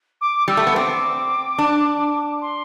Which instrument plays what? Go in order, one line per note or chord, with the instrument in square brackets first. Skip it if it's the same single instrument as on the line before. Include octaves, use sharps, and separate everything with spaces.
[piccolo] D6
[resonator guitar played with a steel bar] G3 [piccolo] E6
[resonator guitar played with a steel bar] A3
B3
[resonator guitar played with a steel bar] C4 [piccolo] D6
[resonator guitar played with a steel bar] D4
[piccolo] C6